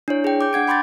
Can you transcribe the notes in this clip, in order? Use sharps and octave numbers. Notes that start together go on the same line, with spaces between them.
D4 E4 C#5
G#4 G5
D6 G6
D4 F#5 G#6 D7
G5 B5 C6 D6 G6 A6